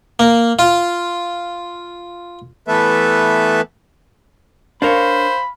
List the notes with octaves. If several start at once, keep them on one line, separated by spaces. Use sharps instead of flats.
A#3
F4
E3 A3 B3 A4 B4 E5
D4 A#4 C5 C#5 F5 B5